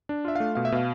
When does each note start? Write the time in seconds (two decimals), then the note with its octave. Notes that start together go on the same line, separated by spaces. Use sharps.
0.09 D4
0.25 F4 E5
0.36 A3 F5
0.55 B2 F5
0.65 E5
0.72 B2 F5